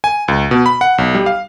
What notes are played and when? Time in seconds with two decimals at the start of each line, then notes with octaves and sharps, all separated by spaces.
0.04 G#5
0.28 C#2
0.51 B2
0.66 B5
0.81 F#5
0.98 B1
1.15 G3
1.26 F5